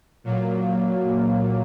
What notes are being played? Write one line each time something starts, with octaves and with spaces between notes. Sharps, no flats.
A#2 F#3 A#3